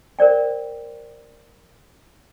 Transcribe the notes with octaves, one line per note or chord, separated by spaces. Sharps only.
A#4 C5 D5 G5